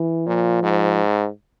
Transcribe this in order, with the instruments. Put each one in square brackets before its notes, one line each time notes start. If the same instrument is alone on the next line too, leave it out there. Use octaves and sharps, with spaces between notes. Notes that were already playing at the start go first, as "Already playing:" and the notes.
Already playing: [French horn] E3
[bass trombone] A#2 [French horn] F3
[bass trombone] G#2